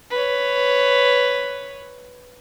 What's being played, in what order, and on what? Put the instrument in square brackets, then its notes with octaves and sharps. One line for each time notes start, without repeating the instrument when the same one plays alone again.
[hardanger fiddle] B4 C#5